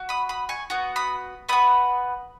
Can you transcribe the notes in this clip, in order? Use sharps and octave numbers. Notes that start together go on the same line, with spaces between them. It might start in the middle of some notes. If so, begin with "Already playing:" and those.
Already playing: F#4
B5 D#6
B5 D#6
G#5 C#6
B3 F#4
B5 D#6
B3 F#4 B5 D#6